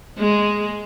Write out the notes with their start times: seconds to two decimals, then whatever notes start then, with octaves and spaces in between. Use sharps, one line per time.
0.19 G#3